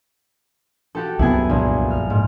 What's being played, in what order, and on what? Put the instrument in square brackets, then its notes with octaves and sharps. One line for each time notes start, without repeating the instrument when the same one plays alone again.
[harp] F#4 G4 A4
[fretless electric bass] C2 F#2 B3 [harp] E4 G#4 G#5
[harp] A#1
F6
G#2